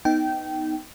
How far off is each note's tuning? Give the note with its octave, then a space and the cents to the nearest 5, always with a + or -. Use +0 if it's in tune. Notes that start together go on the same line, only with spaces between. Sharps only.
B3 +0 D#4 +0 G5 -20